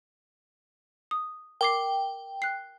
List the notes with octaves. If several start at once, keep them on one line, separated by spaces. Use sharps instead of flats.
D#6
A#4 G5 D6 C7
F#6 C7